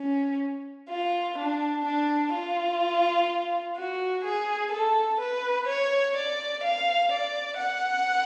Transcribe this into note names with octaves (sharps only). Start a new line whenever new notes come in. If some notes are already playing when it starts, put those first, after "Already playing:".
Already playing: C#4
F4
D4
D4
F4
F#4
G#4
A4
B4
C#5
D5
F5
D5
F#5